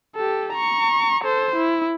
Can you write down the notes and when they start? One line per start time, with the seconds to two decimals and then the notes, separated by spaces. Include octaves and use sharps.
0.15 G4 A4
0.53 A#5 C#6
1.24 A4 C5
1.56 E4